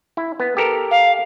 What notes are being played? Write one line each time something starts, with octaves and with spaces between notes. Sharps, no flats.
E4
B3
G4 A4 A#4
F5